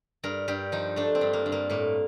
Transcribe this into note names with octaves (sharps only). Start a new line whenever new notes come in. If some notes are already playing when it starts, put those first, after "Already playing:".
G2 A#4
G2 G4
F3 D#4
A3 D4
C4
G2
A#3
G2
A#3
A2 A#3